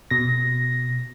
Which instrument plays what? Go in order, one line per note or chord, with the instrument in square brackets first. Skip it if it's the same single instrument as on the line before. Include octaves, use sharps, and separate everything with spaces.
[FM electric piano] B2 A#6